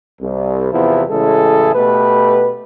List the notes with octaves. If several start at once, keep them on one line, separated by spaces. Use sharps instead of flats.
C2
E2 C3 F3 B3 E4
A1 C#3 G#3 E4 G#4 A4
B2 A3 G4 B4